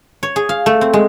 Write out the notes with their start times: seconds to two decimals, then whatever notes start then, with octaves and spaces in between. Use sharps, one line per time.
0.23 C#5
0.36 G#4
0.49 F5
0.66 A3
0.81 C4
0.93 G#3